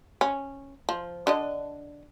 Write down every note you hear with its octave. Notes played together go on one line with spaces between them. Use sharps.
C#4
F3
D3 D4 D#5